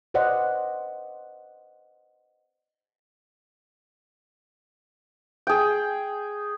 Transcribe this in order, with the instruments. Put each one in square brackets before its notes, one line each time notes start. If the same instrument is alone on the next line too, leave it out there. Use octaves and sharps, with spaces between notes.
[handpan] B4 C5 D5 D#5 F#5
[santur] G#4 G5